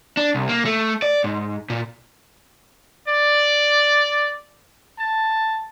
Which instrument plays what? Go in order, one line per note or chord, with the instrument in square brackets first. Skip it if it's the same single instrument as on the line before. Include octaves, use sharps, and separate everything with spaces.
[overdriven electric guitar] D4
C2
A#3
A3
D5
G#2
A#2
[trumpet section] D5
A5